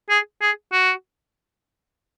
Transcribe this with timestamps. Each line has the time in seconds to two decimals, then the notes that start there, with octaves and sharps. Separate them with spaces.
0.10 G#4
0.41 G#4
0.72 F#4